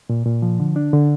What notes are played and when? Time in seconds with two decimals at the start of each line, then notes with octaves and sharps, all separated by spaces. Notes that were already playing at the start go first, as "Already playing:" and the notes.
0.10 A#2
0.26 A#2
0.42 F3
0.60 D3
0.76 D4
0.93 D3